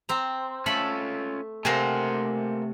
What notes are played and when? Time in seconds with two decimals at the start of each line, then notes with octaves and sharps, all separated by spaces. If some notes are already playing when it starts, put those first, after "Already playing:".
0.09 C4 A#5
0.66 A3 C#4 F4 A4 B5
1.65 C3 A3 A#3 C5 F#5 G#5